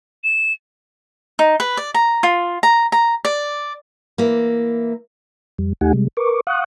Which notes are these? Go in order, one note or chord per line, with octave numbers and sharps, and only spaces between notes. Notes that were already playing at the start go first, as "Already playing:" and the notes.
E7
D#4
B4
D5
A#5
F4
A#5
A#5
D5
E3 A#3
F2 G3
D#2 A3 D#4 G4 F#5 G#5
C3 G3 G#3
A#4 B4 C#6 D6
F5 F#5 C#6 D#6 F#6